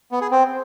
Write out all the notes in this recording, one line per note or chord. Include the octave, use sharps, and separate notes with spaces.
B3
G#4
C4